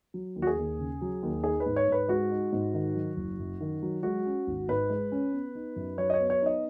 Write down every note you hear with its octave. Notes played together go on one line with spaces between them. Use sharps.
F#3
D#2
F#4
G#4
D#2
C#3
F#3
D#2
D#4 G#4
B4
G#2
C#5
G#2 B4
G#3 F#4
D#4
G#2
D#3
F#3
F#1
F#2
D#3
F#3
G#3 F#4
C#4
G#1
G#2 B4
G#3
C#4
B3
D#4
F#2
F#3 C#5
D#5
C#5
B3
C#5
D#4 D#5